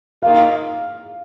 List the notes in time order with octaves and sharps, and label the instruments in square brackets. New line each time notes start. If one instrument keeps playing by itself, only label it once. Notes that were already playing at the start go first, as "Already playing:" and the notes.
[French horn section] D#3 A#3 F4 [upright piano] F5